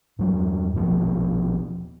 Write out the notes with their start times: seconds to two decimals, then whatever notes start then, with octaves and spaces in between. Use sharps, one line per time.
0.19 E2 G2 F#3
0.74 D#1 A#1 B2 F3